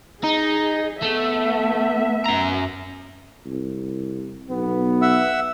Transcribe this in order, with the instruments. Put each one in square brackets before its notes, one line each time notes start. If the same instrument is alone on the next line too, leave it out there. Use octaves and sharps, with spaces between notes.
[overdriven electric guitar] D#4 [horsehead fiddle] G#4
[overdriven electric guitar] A3 [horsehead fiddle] B3 E5
[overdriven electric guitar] F#2 A#5
[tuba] C2
[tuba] B1 [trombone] B3
[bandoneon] E5 F#5 E6